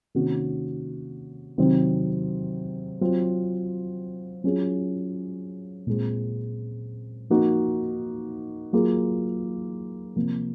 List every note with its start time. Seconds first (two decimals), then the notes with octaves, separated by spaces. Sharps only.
0.15 C3 D#3 A#3 C#4 F#4
1.58 C3 D#3 F#3 C4
3.01 F#3 C4 F4
4.44 F#3 C#4 F4 G#4
5.87 A#2 G#3 C4
7.30 F3 A#3 D#4 F#4
8.73 F#3 A#3 F4 G#4
10.16 C3 F3 A#3